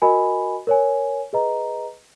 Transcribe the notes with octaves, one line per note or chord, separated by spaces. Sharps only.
F#4 A#4 D#5 G#5 B5
A#4 C#5 G#5
G#4 B4 D#5 A#5